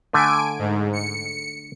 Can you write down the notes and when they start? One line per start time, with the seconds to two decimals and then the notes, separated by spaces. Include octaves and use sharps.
0.13 D3 A3 G#5 D7
0.58 G#2
0.93 C#7